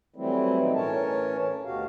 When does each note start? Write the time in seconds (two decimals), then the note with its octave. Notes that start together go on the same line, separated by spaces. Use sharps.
0.16 E3 F#3 G3 A3 C4 E4
0.59 B2 C4 D#4
0.75 A2 E3 C#4 A#4 C#5 A5
1.64 D2 B2 F#4 G4 F5